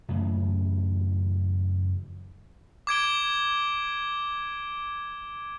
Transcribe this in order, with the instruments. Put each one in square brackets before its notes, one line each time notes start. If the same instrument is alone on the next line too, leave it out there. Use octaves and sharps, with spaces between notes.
[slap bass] F#2 A2 C#3 E3
[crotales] D6 G#6 D7 G7